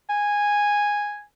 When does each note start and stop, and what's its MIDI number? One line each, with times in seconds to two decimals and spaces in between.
0.10 1.24 80